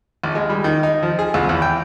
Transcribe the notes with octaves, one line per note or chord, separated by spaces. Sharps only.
A#1
G#3
G3
D#3
D#4
F3
G#4
C2
E2
G5